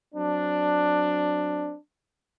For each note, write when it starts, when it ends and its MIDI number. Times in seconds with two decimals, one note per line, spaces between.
0.14 1.74 54
0.14 1.74 60
0.14 1.74 62